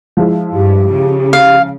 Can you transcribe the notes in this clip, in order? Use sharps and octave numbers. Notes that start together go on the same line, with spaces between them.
F3 G#3 E4
G2 G4
C#3
F5